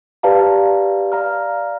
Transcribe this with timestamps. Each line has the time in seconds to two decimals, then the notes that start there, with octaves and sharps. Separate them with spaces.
0.23 G4 B4 D5 F5 A5 A#5
1.12 D5 F5 A#5 F6